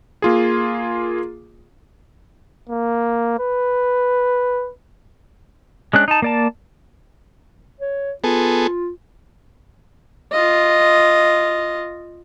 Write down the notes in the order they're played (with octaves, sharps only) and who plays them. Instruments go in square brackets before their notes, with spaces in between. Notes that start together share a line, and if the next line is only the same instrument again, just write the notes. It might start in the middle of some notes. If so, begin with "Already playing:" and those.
[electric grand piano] A#3 F4 G#4
[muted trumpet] A#3
B4
[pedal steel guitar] G#3 C#4 D4 F#6
D#4 A5
A#3 D5 A5
[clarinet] C#5
[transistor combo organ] B3 G#4 A4 [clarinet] F4
[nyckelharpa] F4 D#5